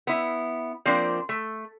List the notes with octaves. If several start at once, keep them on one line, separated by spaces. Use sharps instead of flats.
B3 E4
F3 A#3 C4 D4 C5
A3